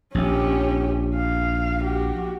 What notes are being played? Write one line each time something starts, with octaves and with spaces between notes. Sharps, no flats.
A#1 C#4 G4
F5
F#4 G4